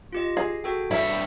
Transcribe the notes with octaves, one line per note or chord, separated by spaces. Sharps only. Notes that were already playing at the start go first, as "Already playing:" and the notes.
F4 G4 D#5
G#4 C7
F#4 A4 G5
G2 E4 C#5 B6